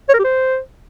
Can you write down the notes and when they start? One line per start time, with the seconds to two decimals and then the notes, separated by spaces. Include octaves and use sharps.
0.09 C#5
0.14 A#4
0.19 G4
0.24 C5